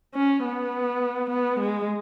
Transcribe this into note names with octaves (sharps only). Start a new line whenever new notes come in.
C#4
B3
B3
G#3